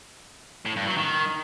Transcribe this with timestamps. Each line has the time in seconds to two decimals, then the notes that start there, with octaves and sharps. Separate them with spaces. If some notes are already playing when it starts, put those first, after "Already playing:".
0.65 A2
0.76 G2
0.87 F#3
0.98 D#3